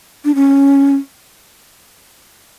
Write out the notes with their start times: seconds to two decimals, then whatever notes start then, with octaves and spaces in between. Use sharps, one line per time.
0.25 D4
0.35 C#4